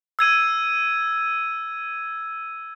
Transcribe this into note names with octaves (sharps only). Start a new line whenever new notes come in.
E6 G#6 D#7